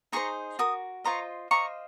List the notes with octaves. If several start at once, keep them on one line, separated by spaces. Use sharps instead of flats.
D#4 G#4 C5 A#5 C#6
F#4 A#4 D#6
F4 C5 D#5 A#5 C#6
F4 C5 D#5 A#5 C#6